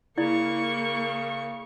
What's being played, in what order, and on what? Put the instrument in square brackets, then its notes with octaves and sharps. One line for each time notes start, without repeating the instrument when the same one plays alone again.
[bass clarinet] C#3 [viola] A#3 C#6 [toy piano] E4 D5